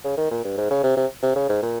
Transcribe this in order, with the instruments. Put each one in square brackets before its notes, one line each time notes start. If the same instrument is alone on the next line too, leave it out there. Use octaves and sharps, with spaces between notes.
[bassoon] C#3
D#3
A#2
G2
G#2
C#3
C3
C3
C3
C#3
G#2
A#2